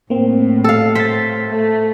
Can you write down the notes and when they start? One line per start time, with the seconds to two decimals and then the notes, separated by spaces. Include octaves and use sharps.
0.10 A2 A#3 C4
0.64 A4 F5
0.95 C5 A6 B6
1.50 A3